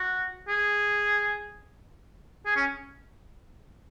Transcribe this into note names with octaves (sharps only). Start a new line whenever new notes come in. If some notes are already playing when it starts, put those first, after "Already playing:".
Already playing: F#4
G#4
G#4
C#4